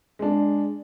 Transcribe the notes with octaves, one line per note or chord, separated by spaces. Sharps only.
G#3 D4